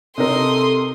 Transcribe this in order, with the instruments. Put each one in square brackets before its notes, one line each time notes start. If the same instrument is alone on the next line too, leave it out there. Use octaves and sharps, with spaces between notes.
[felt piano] C3 D#4 A#4 [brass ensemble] A4 [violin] C6 D#6